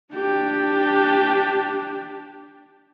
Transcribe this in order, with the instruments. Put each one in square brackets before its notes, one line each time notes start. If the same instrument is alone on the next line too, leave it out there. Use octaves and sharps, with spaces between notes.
[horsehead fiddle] D4 G4